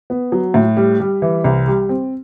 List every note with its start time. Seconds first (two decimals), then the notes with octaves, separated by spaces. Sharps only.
0.10 B3
0.32 F#3
0.54 A2
0.77 G3
1.00 G3
1.22 E3
1.44 C2
1.67 G3
1.89 C4